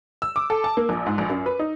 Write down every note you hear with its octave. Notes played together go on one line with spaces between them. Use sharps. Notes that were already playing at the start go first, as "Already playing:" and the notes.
E6
D6
A4
A5
A#3
A#1
G#2
A#1
F#2
B4
D#4